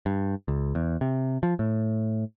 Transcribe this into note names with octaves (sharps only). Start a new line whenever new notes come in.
G2
C#2
E2
C3
F3
A2